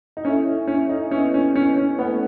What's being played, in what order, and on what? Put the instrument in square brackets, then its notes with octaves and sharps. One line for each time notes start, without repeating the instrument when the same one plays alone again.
[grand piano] D#4
[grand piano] C#4 [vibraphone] E4 A4 E5
[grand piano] C#4
D#4
[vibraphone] B3 E4 B4 D#5 [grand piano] C#4
[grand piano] C#4
C#4
C#4
[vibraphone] A3 C#4 E4 A4 [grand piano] B3